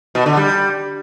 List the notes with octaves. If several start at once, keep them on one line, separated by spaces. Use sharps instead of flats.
B2
D3
G3